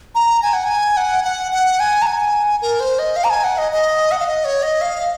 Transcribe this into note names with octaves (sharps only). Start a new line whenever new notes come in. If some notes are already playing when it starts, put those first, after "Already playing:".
A#5
G#5
F#5
G#5
F#5
F#5
F#5
G#5
A#5
G#5
A#4
C5
D#5
F5
A#5
G#5
F#5
D#5
D#5
F#5
F5
D#5
C#5
D#5
F5